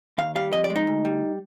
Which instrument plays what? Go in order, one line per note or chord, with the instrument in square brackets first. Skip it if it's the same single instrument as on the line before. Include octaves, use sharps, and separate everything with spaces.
[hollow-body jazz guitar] D#2 F5
G3 F5
F2 D#5
D5
G#3
D#4
D2
G3